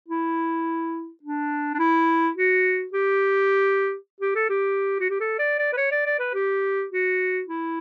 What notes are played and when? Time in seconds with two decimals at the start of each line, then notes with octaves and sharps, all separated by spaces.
0.08 E4
1.23 D4
1.74 D4
1.79 E4
2.36 F#4
2.93 G4
4.20 G4
4.35 A4
4.49 G4
5.00 F#4
5.10 G4
5.20 A4
5.38 D5
5.58 D5
5.72 B4
5.77 C#5
5.91 D5
6.06 D5
6.19 B4
6.34 G4
6.91 F#4
7.47 E4